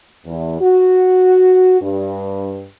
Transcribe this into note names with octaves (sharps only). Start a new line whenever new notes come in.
E2
F#4
G2